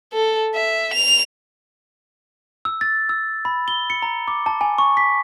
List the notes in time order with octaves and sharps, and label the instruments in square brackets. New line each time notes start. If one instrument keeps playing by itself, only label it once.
[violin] A4
E5
F7
[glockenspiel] E6
A6
E6
B5
G7
C#7
A#5
D6
A5
G#5
C#6
B6